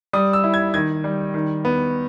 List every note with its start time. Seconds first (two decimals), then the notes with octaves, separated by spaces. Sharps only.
0.13 G3 D#6
0.33 E6
0.44 E4
0.54 G#6
0.74 D#3 G#6
1.04 G3
1.34 D#3
1.65 B3